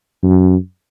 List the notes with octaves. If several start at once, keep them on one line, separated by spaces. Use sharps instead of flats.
F#2